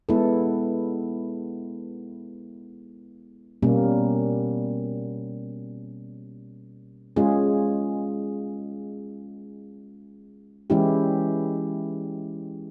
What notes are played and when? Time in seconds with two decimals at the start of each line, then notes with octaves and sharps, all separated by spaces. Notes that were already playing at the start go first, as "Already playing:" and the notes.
0.09 G#3 B3 E4 A4
3.62 B2 G3 A#3 C#4
7.16 G#3 C#4 F4 G#4
10.70 E3 G#3 C#4 E4 G4